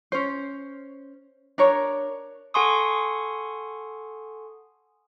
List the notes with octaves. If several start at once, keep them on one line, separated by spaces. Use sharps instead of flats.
C#4 C5
D4 A#4 C#5
A4 F#5 G#5 C6 C#6 D#6